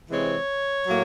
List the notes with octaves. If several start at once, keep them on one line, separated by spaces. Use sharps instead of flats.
C3 E3 G#3 C4 C#5
A2 F#3 A#3